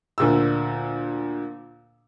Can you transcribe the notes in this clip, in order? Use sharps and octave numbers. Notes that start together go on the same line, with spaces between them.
D2 A#2 E6